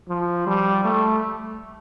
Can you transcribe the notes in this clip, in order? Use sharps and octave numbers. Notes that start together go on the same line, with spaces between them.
F3
G3
A3